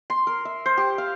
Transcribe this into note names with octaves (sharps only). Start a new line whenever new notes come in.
C6
A#4
E5
C5
G4
F5